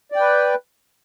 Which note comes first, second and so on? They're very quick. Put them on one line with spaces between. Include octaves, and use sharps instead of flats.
D5 G5 B4